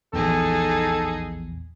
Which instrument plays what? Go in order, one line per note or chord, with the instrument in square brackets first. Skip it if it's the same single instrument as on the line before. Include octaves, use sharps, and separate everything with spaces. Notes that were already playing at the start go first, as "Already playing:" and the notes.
[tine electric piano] A#1 E2 [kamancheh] D#4 G#4 [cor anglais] A4